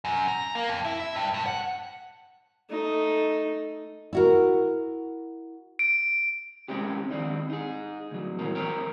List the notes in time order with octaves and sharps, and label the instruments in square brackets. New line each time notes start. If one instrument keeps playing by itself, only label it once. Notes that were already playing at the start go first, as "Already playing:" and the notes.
[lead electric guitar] F#2
A#5
A#3
F2
E4
E5
G2
G2
F#5
[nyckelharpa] A3 D#4
[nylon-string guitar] E4 F#4 A#4
[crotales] D7
[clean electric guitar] C3 G#3 C4 C#4 G4
D#3 C4 D4 D#4
D#4 G#4
D2 F#3
G2 A#2 E3 F#3 C4 A#4
E3 A#4 C5 C#5 G5 A#5